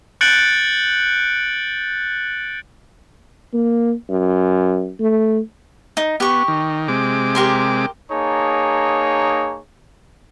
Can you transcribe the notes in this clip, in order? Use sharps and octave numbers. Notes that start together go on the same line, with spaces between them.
F#6 G6 A6 C#7 D7 F#7
A#3
F#2
A3
D#4
B3 G4 C#6
D#3
C3 G#3 D6
G4 A#4 C6
A#3 D#4 G#4 C#5 A5